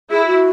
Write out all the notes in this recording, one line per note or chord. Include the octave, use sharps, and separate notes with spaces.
E4 G#4
F#4